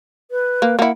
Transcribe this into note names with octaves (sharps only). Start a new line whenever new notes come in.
B4
A#3
A#3 E4 F#5